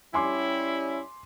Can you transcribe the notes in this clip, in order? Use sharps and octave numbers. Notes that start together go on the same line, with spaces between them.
G3 C#4 E4 G#5 C6 D6